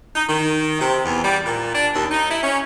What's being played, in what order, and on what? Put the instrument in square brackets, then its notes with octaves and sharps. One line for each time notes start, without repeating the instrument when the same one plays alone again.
[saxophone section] D#4
D#3
C3
E2
G3
A#2
D4
D#2
D#4
E4
C#4